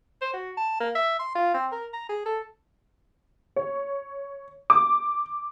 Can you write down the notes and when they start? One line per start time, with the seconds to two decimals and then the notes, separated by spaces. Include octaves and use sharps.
0.22 C5
0.33 F#4
0.57 A5
0.80 A#3
0.95 E5
1.19 C6
1.35 F4
1.54 C4
1.72 A#4
1.93 A#5
2.09 G#4
2.26 A4
3.56 C#5
4.70 D6